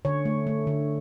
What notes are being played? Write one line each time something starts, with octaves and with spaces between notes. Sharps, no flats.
D3 C#5
A3
A3
D3